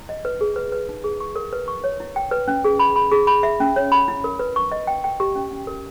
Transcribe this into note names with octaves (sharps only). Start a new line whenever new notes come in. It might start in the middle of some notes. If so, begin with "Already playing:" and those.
Already playing: E4
D#5
B4
G#4
B4
B4
D#4
G#4
C#6
A#4
B4
C#6
C#5
E4
G5
B4
C#4
G#4
B5
B5
G#4
B5
E5
C#4
C#5
B5
E4
A#4
B4
C#6
D#5
G5
G5
G4
C#4
C#4
A#4